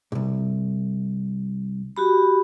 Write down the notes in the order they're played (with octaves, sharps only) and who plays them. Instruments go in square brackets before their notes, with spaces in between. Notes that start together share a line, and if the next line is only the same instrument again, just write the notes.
[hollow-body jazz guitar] C2 G#2
[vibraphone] F#4 G4 B5